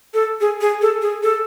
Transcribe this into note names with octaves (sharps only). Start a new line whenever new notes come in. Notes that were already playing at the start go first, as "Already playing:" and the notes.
A4
G#4
G#4
A4
G#4
A4